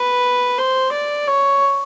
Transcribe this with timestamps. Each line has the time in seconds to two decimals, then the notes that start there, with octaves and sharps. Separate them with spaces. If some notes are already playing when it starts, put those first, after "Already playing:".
Already playing: B4
0.58 C5
0.92 D5
1.27 C#5